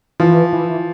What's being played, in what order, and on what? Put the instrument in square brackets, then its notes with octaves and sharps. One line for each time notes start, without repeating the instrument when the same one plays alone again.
[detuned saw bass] E3 [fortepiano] F3
[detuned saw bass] E3